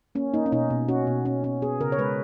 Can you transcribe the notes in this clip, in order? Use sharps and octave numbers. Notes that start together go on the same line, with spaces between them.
A#3 C#4
A#3 D#4
C#4
B2 D#4
B2
C#4 F#4
B2
C#4
C#4
B3 G#4
C#3 A#4
C#5
G#3 B4